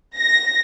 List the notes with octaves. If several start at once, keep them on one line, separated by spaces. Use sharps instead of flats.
A#6